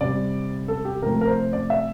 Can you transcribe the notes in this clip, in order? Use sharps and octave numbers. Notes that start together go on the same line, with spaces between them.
C3 G3 D5
A4
G4
C3 F3 A3 A#4
A#4
C5
D5
E5